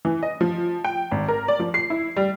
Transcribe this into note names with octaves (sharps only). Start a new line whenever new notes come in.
E3
D#5
F3
G5
G#1
A#4
D5
F3
C7
E4
G3